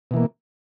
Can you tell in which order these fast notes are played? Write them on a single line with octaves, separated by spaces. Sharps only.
B2 E3 A#3